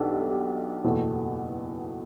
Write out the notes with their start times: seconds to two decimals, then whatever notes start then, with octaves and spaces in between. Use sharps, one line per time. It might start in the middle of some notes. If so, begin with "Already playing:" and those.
Already playing: B1 B2 B3 D4 G4 A4
0.12 G4
0.20 A4
0.30 G4
0.84 F#1 E2 B2 A3